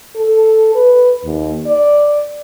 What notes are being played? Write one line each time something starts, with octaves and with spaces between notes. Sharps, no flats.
A4
B4
D#2
D5